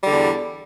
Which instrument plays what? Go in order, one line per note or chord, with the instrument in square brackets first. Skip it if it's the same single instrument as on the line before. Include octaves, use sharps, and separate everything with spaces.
[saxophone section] G3
D3
E2